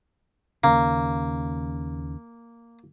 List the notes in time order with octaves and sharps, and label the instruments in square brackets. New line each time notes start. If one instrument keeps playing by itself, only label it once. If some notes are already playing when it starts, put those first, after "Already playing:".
[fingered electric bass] D#2 C#3 [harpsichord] A#3